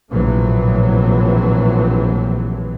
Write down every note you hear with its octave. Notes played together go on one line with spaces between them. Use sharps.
A#1 A2 C3 E3 F#3